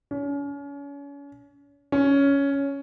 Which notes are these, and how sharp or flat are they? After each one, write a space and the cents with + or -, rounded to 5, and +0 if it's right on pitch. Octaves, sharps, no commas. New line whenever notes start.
C#4 +35
C#4 +10